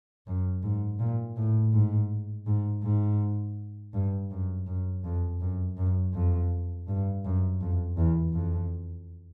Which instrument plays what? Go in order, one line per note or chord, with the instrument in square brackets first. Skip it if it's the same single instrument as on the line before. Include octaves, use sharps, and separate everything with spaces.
[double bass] F#2
G#2
A#2
A2
G#2
G#2
G#2
G2
F#2
F#2
F2
F#2
F#2
F2
G2
F#2
F2
E2
F2